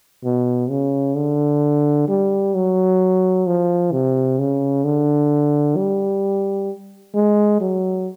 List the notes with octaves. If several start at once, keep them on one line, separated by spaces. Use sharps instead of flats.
B2
C#3
D3
G3
F#3
F3
C3
C#3
D3
G3
G#3
F#3